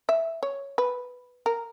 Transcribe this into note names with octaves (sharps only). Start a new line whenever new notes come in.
E5
C#5
B4
A#4